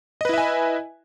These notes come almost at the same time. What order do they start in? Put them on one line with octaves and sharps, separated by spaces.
D#5 B4 E4 E5 G#5